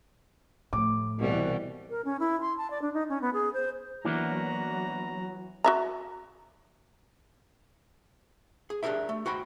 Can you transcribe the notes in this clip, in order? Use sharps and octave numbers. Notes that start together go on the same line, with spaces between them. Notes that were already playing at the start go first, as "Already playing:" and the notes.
A2 F3 D6
C2 B2 E3 G3
A#4
C#4
E4
C6
A5
D5
D4
D#4
C#4
B3
G#4
C5
E3 F#3 A#3 B3 D4 F#4 A#5
F#4 E5 A#5
G#4
D4 G4 G#4 A#4 E5
A3
F#4 C5 G5 B5